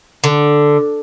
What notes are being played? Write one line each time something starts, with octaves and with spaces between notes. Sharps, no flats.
D3